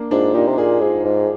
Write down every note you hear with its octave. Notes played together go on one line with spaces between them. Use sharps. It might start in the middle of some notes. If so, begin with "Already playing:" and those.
Already playing: A#3 D4
G#2 D4 F4
A#2 D#4 G4
C3
A#2 F4 G#4
G#2 F4 G#4
G#2